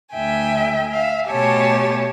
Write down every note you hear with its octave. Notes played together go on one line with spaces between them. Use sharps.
D2 E5 G5 G#5
E5 F5
B2 A3 G4 C#5 G#5 A5